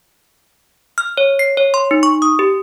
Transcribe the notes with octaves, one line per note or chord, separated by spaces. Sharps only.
F6
C#5
C7
C#5
C6
D#4
C#6
D#6
G4